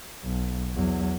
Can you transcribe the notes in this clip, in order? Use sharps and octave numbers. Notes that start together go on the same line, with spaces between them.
B1
E2 F#3